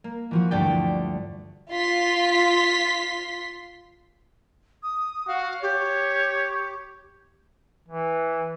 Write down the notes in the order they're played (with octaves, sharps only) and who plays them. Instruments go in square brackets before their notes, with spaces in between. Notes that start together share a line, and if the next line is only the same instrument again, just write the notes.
[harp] A#3
E3 F3 F#4
D2 G2 D3 D5 G5 B6
[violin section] F4 C6 B6
[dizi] D#6
[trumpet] F#4 [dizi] F5
[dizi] G4 [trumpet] C#5
[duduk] E3